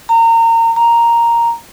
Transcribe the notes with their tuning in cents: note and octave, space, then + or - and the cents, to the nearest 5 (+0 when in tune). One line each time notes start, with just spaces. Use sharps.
A#5 -30
A#5 +0